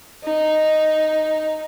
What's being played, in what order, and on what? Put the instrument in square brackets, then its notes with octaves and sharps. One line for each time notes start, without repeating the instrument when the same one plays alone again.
[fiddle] D#4